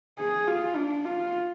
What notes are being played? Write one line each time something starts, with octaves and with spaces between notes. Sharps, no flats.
G#4
F4
D4
F4